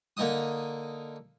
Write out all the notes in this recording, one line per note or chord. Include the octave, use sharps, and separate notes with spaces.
D3 A#3 D#4 D#5 D#6